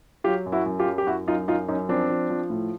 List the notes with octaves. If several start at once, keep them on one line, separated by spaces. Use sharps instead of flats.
F#3 F4 G4
F#2
E4 F#4
F#2
F4 G4
F#3
G4
F#2 E4 F#4
F#2 D#4 F4
F#2 D#4 F4
F#2 C#4 D#4
F3 C4 D4
F3
F3
A2